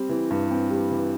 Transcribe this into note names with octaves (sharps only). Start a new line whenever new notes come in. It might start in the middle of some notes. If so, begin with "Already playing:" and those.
Already playing: G3 C4
E3
G2
C4
G3
E3